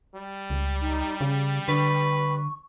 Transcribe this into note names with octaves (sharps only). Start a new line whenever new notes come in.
G3
C#2
D#4
C#3 F5
D3 B4 C#6